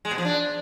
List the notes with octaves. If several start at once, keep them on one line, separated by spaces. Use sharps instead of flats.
G#3
B2
F3
D4